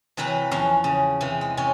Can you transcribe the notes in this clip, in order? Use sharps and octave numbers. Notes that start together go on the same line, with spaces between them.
C3 E3 F#3 E4 B4
E2 F3 C#4 F5
C#3
C3 E3
G#3
C3 C#4